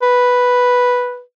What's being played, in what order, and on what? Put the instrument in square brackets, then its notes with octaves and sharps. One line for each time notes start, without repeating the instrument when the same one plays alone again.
[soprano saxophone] B4